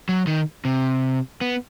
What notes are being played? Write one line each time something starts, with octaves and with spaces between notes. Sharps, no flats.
F#3
D#3
C3
B3